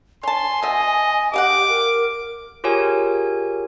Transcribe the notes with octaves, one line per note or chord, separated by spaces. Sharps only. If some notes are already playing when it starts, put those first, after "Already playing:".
C#5 G#5 A5 C6
B2 D#5 E5
G4 D#5 F5 F#5 D6
A#4
F4 G4 G#4 A#4 C#5 G#5